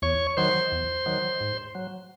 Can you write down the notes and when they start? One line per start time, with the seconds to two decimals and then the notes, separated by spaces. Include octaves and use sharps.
0.02 E2 C#5 C#6
0.37 D#3 F#3 C5 C6
0.72 E2
1.06 D#3 F#3
1.41 G#2
1.75 F#3